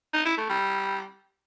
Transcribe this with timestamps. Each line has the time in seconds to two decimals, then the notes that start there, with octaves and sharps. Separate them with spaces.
0.13 D#4
0.25 E4
0.37 A3
0.49 G3